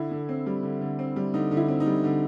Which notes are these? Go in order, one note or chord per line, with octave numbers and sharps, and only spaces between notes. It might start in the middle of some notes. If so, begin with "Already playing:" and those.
Already playing: D3 E4
D3
C4
G3
D3
D3
C4
G3
D3 D#4
D3
E4
C4
D#4
G3
D3